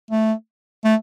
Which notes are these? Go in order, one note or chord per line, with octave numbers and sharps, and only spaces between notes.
A3
A3